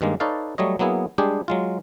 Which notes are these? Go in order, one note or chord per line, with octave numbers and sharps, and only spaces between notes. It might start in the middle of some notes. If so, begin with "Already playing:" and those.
G2 D#3 G#3 A#3
D#4 A4 B4 C#5 D5 F5
F#3 G3 A3 C#5 D#5
F#3 A#3 B3 E4 G#4
G3 G#3 D4 G4 G#4
F#3 G#3 F4